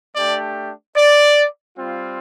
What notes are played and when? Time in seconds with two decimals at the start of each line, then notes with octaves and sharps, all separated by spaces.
0.15 A3 D4 G4 D5
0.96 D5
1.77 G3 C4 F4